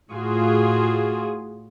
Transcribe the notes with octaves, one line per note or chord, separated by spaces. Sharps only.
A2 F4 F#4 G#4